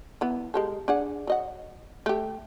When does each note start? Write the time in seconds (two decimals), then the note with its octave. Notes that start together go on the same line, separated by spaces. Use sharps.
0.21 E3 B3
0.54 G#3 G4 A4
0.88 D4 G#4 F#5
1.27 F#3 D#5 F#5
2.06 A3 G4